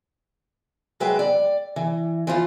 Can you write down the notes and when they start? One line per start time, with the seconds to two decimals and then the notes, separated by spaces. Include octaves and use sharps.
1.00 F#3 G#3 B4 E5 G5
1.19 D5
1.76 E3
2.27 E3 F3 F4